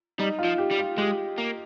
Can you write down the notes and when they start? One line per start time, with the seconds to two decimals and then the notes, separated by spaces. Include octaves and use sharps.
0.18 G3 D#4
0.39 F4
0.45 F3
0.58 G4
0.71 G3
0.79 F4
0.98 G#3 G4
1.38 A#3